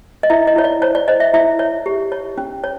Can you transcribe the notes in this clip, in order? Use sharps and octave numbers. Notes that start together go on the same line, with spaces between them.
D#5
E4 E5
D#5
E4 C#5
D5
C5 C#5
D5
C5 D#5
E5
E4 E5
C#5
G4
C#5
C#4
C#5